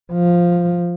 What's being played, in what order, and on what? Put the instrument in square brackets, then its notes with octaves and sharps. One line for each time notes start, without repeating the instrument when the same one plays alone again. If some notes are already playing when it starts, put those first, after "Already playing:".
[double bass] F3